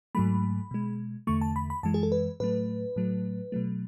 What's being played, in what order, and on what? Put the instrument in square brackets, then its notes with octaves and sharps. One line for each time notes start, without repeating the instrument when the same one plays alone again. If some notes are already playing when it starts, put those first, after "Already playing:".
[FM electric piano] G#2 F#3 A3 B5
B2 G#3
E2 D3 A3 C#6
A5
B5
B5
F#2 E3 G#3 A5
G#4
A4
B4
A2 F#3 A3 B4
A2 F#3 A3
B2 F#3 A3